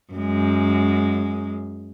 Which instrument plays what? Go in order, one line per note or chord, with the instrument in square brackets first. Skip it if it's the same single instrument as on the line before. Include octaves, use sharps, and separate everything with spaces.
[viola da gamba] F#2 G#3